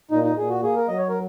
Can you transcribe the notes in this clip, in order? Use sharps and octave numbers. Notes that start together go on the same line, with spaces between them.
A#2 D#4
D#4
A#2 G#4
F#4
A#3 G#4
A#4
F#3 D#5
C#5
A#4